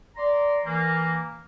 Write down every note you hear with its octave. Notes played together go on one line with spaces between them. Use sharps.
D5 A#5 C6 D6
E3 A#3